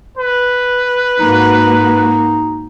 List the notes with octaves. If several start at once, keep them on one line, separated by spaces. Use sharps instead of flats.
B4
G#2 A#3 D#4 F#4